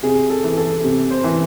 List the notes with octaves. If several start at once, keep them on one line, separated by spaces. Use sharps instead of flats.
C3 G#4
A4
E3
A4
C3
C5
E3